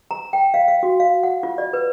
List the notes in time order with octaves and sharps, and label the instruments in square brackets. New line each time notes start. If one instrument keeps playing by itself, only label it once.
[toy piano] A#5
G5
F5
F5
F#4
F5
F#5
F4
D5
B4